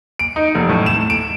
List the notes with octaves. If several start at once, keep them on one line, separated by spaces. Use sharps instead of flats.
D7
D#4
F1
A2
E7
D7